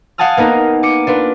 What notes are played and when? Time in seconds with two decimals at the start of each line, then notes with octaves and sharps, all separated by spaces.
0.18 F5 F#5 G#5 A5 D#6 F6
0.37 A#3 B3 D#4 A#4
0.83 D6 C#7 D#7
1.07 D4 F4 B4